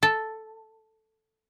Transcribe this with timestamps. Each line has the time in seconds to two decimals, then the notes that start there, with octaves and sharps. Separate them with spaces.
0.03 A4